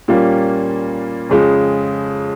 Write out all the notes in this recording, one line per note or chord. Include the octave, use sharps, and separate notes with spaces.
A#2 G3 A#3 C#4
F2 C#3 G#3